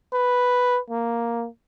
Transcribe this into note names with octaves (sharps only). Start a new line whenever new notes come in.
B4
A#3